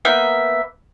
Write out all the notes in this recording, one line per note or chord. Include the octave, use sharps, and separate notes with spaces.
A#3 B3 E5 G6